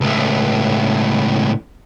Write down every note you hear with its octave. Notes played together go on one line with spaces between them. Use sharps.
C#2 A2